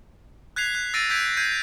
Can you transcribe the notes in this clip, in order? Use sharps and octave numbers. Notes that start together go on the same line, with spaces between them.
F#6 G#6 B6 C7 F7
F#6
E6 A6 A#6 C7 D7 D#7
E6 G6 G#6 B6 D7 F7
G6 G#6 C7 D#7